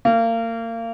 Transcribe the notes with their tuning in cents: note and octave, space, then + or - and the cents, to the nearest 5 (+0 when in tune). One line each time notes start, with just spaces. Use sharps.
A#3 -30